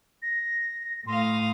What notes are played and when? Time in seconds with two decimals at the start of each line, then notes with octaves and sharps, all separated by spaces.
0.22 A#6
1.07 A2 F5 C6 D#6